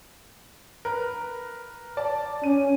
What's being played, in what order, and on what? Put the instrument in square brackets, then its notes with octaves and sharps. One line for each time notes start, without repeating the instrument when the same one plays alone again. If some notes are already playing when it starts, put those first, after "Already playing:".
[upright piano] A#4 B4
D5 A5
[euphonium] C#4 [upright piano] D#7